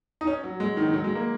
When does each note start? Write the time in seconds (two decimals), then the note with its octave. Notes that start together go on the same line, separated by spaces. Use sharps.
0.21 D#4
0.27 C#4
0.44 F#3
0.60 G#3
0.77 D#3
0.88 D#3
0.93 F#3
1.04 G#3
1.15 A#3